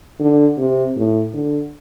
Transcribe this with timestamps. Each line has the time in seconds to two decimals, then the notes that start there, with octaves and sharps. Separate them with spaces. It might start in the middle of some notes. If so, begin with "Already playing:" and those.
0.20 D3
0.58 C3
0.96 A2
1.34 D3